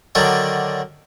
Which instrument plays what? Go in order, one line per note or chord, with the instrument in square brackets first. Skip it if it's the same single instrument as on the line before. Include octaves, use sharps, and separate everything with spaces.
[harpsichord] D3 D#3 F#3 D4